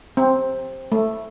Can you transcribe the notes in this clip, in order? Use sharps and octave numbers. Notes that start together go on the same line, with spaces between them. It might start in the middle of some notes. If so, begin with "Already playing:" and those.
C4
A3